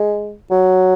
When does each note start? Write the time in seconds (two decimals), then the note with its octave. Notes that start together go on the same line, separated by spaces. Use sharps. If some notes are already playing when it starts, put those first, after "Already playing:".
Already playing: G#3
0.51 F#3